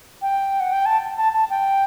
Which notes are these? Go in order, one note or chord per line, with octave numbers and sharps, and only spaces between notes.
G5
F#5
G5
A5
A5
A5
G5